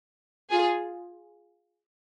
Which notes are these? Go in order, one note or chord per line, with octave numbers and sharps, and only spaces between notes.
F4 G#4